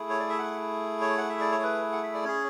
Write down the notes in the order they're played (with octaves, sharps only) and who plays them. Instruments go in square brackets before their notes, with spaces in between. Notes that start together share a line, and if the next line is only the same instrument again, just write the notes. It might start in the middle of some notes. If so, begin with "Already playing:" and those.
Already playing: [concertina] A3 E4 G#4
C#5
D5
E5
F#5
C#5
F#5
E5
D5
C#5
B4
F#5
E5
D5
C#4 G#4 C#5